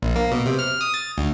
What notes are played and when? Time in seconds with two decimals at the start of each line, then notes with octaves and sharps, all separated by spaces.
0.02 A#1
0.16 A#3
0.32 B2
0.46 C3
0.59 F6
0.81 D#6
0.94 A6
1.18 D2